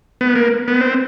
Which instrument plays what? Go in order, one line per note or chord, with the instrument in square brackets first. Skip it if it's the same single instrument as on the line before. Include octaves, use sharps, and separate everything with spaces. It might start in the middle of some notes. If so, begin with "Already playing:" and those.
[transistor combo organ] B3
A#3
B3
C4